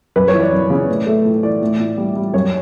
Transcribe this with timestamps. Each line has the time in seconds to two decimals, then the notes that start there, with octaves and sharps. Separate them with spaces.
0.16 F#2 B4
0.28 C#5
0.34 E3
0.40 D5
0.52 F#2
0.70 C#3
0.89 A2
1.07 A3
1.25 A2
1.43 E3 D5
1.61 A2
1.79 A2
1.98 G3
2.16 G3
2.34 F#2 C#5